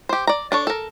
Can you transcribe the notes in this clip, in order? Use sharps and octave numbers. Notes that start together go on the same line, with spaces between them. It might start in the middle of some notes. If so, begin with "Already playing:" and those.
G4 C5
D5 A#5
D4 A4 C#5
A4 A#4